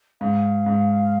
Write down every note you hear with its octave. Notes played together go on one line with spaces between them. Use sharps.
G#2 F5
G#2